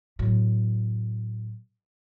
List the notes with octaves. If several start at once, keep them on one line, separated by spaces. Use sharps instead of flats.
A2 F#3